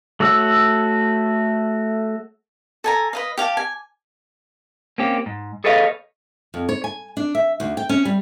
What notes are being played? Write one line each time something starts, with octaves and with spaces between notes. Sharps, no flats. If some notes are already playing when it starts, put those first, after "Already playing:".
A3 F#4 C#5 E6
A4 G#5 A#5
B4 D#5 F5
G4 F5 G#5 A5
G#5
A#3 C4 C#4 G4
G#2
G#4 A4 B4 C#5 D#5 F5
F2
C#5
G#5
D4
E5
D2
G5
C#4
G3